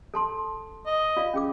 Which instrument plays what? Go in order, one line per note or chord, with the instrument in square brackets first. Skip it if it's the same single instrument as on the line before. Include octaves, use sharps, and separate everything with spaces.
[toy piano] A4 A5 C6
[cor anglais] D#5
[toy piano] F4 D5 F5
C#4 G#4 D6